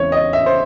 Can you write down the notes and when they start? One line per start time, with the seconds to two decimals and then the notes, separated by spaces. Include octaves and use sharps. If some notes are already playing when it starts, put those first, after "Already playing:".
Already playing: E2 C#3 E3 G#3 C4 C#5
0.12 D#5
0.33 E5
0.46 C5